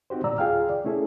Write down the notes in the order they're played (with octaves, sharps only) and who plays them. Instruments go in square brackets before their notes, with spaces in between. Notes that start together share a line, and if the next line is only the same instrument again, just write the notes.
[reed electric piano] C4 D#4 F#4 G4 C5
A#2 G3 D5 A#5 E6
D#2 F4 G#4 F5 G5 F6
D5
A3 C#4 E4 G#4 A4